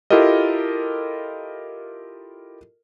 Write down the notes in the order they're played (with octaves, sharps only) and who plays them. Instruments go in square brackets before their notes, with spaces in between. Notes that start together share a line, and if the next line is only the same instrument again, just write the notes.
[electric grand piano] E4 F4 G4 A4 A#4 D#5